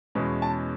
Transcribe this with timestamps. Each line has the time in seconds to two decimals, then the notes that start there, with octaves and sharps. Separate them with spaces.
0.15 E2 B2 G#3 C#4
0.42 A5